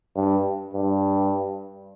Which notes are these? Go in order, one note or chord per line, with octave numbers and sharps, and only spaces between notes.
G2
G2